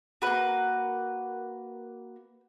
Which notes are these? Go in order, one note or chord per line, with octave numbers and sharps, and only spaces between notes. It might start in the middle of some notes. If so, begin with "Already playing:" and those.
A#3 D#4 F#4 B4